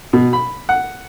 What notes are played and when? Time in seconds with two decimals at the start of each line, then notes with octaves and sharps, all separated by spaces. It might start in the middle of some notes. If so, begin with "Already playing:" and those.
0.13 B2
0.33 B5
0.69 F#5